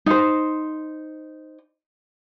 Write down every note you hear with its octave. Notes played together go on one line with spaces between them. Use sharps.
D#4 C5